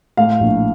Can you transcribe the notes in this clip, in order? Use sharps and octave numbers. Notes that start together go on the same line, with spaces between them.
A2 F5
A#1